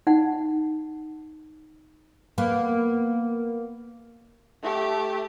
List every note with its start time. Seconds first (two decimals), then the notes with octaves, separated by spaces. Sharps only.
0.07 D#4 F#5
2.38 A#3 B3
4.62 A3 G4